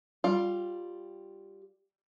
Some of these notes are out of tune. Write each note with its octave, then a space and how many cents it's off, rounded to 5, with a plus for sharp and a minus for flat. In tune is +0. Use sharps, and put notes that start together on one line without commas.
G3 +0 F4 +10